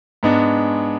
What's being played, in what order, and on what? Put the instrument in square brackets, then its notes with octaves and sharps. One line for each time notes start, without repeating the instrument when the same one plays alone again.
[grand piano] G#2 G#3 B3 D4